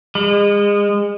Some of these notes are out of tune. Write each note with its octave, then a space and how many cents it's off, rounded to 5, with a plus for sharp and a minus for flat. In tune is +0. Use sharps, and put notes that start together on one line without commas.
G#3 -30